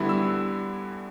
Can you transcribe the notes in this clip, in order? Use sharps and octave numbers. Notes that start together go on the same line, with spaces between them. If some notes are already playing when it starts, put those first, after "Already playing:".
Already playing: D2 D3 G3 B3 E4
E6